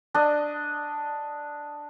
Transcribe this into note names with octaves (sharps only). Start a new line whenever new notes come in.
D4 D#5